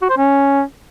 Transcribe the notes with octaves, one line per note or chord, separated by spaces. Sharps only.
F#4
C5
C#4